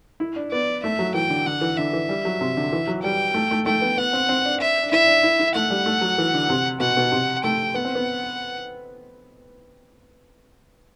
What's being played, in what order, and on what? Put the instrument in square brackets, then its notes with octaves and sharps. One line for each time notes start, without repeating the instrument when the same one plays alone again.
[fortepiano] E4
D4
[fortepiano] B3 [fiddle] D5
[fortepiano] A3 [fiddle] E5
[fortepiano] F#3
[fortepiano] E3 [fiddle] G5
[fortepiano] D3
[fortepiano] D3 [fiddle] F#5
[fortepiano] E3
[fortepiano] D3 [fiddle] E5
[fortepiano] E3
G3
F#3
C3
D3
E3
F#3
[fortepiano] G3 [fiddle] G5
[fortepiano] A3
A3
[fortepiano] A3 [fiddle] G5
[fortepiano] B3
[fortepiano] B3 [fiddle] F#5
[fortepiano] C4
C4
D4
[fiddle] E5
[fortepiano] D4
[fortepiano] E4 [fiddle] E5
[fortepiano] D4
E4
E4
[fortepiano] A3 [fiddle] F#5
[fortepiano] G3
A3
F#3
E3
D3
C3
[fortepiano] B2 [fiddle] F#5
[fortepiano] B2
C3
[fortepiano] A3 [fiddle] G5
[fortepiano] B3 [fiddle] F#5
[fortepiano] C4
B3